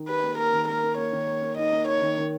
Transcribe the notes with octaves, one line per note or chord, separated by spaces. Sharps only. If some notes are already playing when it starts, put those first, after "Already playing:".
Already playing: D#3 D#4
G4 B4
A#3
A#3 A#4
D#3
A#3 A#4
A#3
A#3 C#5
D#3
A#3
A#3
D#4 D#5
A#3
D#4 C#5
D#3
D#3